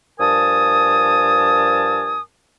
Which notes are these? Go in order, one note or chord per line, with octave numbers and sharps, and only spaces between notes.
G2 F3 A#4 G#5 A5 D#6